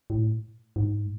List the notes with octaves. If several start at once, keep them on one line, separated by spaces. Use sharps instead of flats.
A2
G#2